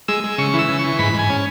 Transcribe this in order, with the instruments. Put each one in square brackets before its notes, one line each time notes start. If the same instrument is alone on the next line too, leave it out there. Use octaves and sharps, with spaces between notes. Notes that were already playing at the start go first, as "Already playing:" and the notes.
[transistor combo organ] G#3 E6
G#3
C#3 C#6
E3
E6
C#3
C#6
E3
G#2 B5
G#2
G#5
C#4